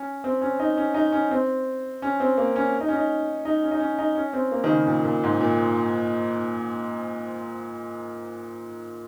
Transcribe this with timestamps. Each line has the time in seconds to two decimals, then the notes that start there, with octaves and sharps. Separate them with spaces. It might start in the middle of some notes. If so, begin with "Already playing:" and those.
Already playing: C#4
0.24 C4
0.41 C#4
0.60 D#4
0.77 C#4
0.94 D#4
1.12 C#4
1.31 C4
2.02 C#4
2.20 C4
2.38 A#3
2.56 C#4
2.81 D#4
2.88 C#4
2.95 D#4
3.45 D#4
3.63 C#4
3.71 D#4
3.80 C#4
3.99 D#4
4.16 C#4
4.33 C4
4.52 A#3
4.64 D#3
4.69 C#3
4.87 A#2
5.05 A#2
5.23 G#2
5.41 A#2